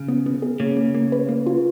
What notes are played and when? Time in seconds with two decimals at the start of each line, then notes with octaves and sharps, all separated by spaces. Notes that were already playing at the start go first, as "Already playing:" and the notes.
Already playing: C#3
0.08 B3
0.26 B3
0.42 G#4
0.60 C#3 A#3
0.77 A#3
0.95 A#3
1.12 B4
1.29 A#3
1.46 F4